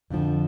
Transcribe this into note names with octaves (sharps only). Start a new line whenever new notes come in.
F2 D3 F3